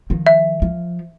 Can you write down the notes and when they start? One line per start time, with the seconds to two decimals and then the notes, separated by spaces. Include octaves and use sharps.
0.10 D#3 F3
0.26 E5
0.62 F3